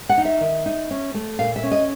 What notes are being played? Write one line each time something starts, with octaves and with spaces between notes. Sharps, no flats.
F#5
D#4
E5
D#3
D#4
C#4
A3
A#2 F5
E5
C#4
D#5